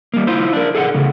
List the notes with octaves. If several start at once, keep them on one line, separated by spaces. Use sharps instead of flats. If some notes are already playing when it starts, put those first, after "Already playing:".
G3 A#3
E4 F4 C5
D4 A#4
G#4 A4 D#5 F#5
A2 C#3